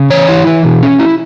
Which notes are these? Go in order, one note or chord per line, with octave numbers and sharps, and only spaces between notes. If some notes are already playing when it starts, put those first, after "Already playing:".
Already playing: C#3
E3 C#5
E4
E3
B2
C#4
E4